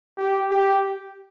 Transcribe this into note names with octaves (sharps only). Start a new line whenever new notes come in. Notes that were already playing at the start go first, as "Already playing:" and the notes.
G4
G4